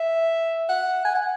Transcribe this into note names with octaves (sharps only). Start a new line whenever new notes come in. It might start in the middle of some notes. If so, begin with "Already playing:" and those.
Already playing: E5
F#5
G#5
F#5